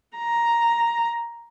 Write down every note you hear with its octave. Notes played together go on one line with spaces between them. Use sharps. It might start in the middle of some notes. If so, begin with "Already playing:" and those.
A#5